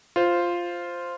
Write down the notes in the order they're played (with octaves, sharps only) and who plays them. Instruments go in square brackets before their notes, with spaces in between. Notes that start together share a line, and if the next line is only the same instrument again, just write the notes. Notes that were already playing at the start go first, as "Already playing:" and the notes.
[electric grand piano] F4 C5